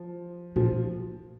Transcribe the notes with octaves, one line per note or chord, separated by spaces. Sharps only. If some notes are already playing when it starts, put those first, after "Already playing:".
Already playing: F3
A#2 F3